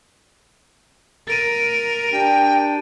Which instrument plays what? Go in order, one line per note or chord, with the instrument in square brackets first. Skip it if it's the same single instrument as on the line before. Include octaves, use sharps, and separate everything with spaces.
[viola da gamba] A#4 [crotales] A6 D7 D#7
[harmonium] D4 G4 [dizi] G5